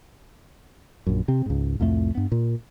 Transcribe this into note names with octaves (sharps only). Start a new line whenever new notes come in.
A#1 F#2
C3 C4
C#2 G#2
C2 F2 A2 A3
G2 B3
A#2